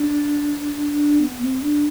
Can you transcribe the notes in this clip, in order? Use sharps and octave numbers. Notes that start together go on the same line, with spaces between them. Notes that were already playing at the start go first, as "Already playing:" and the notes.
Already playing: D4
B3
C4
D4